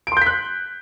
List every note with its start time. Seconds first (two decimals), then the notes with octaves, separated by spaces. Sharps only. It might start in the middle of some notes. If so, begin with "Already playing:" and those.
0.07 D7
0.12 C6
0.17 G6
0.22 B6
0.26 F#6